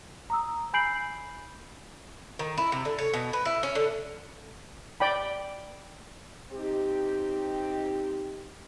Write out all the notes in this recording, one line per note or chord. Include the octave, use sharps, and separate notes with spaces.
A#5 D#6 E6
G#5 B5 G6 C7 D7 F#7
D#3
E4
C3
D3
C#5
B2
B4
E4
C#4
D3
D5 G5 B5
C4 D#4 G4